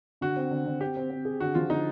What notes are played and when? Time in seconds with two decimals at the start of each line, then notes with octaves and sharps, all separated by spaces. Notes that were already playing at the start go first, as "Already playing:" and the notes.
0.21 D3 F#4
0.36 C4
0.51 D3
0.66 D3
0.81 C4 G4
0.96 C4
1.10 C4
1.25 G#4
1.40 D3 F#4
1.55 F3 F4
1.70 D3 D#4